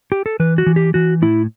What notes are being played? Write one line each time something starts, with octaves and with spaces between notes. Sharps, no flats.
G4
A4
E3 B4
F#4
E3
G4
E3 F#4
A2 E4